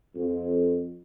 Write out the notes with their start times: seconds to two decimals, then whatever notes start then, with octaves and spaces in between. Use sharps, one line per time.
0.16 F2